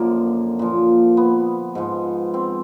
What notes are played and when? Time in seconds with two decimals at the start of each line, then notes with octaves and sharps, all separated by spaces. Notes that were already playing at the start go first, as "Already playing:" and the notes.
Already playing: F#2 D3 F3 A#3
0.59 A#2 F3
1.17 B3
1.75 G#2 F3
2.34 C4